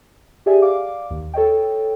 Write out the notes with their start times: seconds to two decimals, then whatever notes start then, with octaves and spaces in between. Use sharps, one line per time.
0.46 G4 G#4 D5 E5 G#5
0.62 D5 F5 D6
1.11 D#2
1.34 A4 C#5 D#5 G5